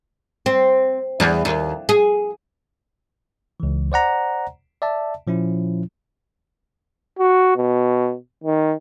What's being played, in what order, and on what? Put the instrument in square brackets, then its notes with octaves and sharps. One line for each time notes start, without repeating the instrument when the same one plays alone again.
[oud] C4
E2
D#2
G#4
[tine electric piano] C#2 E3
C5 D5 F#5 A#5
D5 E5 A5
A#2 F3 C#4 E4
[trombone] F#4
B2
D#3